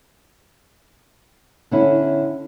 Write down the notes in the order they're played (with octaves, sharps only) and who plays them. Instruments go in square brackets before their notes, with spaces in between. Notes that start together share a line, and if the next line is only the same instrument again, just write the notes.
[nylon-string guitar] D3 C#4 E4